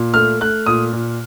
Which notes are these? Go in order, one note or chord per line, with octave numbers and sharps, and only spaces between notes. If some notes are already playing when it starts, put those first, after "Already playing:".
Already playing: A#2
A3 F6
A3 F#6
A#2 D#6
A#2